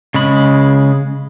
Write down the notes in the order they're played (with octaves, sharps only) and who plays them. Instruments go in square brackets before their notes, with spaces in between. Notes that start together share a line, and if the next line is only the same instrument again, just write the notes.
[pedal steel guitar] C#3 G#3 B5